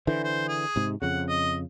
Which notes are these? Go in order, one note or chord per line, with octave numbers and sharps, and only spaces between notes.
D3 E3 C5
C5
G#4
G#2 C3
F2 C#3 F#5
D#5